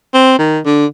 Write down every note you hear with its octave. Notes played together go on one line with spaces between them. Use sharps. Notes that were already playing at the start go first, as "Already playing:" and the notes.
C4
D#3
D3